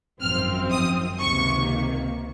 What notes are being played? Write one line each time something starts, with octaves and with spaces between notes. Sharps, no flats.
G#1 F#2 F3 C4 F6
D#6
C#2 C3 D#3 A#3 C#6